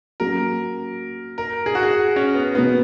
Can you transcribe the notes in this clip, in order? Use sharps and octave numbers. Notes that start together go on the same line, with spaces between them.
F#3 A#3 C#4 A#4
A#4
G#4
F#4
G#4
C#4
B3
B2 A#3 B3 D#4